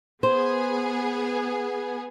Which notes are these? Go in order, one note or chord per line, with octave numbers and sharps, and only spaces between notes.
B3 G#4 C5